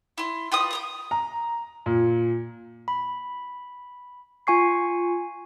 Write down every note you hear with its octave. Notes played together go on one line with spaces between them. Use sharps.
E4 C6
F4 G4 B4 D#6
G5 A#5 D#6
A#5
A#2
B5
F4 G#5 C#6 C7